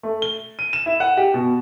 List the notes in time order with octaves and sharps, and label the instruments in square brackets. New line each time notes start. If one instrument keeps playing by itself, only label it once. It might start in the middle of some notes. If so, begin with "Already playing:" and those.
[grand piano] A3
G7
D#7
E7
E4
F#5
G4
B2